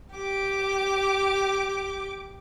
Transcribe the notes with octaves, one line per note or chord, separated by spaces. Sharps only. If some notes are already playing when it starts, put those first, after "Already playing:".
G4 D6